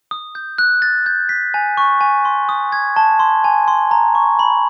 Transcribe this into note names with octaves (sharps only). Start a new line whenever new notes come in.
D#6
G6
F#6
A6
G6
B6
G#5
C#6
G#5
C6
D#6
G#6
A5
C6
G#5
C6
A#5
C#6
B5